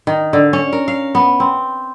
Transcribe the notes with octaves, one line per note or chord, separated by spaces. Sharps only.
D#3
D3
C#4
A#4
F5
B3
C4